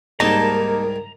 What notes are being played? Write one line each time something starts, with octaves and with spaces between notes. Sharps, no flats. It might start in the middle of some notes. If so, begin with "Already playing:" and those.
C2 G#2 G3 A#3 D#4 A#4 A5 A#5